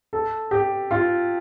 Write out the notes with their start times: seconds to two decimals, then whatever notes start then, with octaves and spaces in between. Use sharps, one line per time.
0.13 A4
0.51 G4
0.91 F4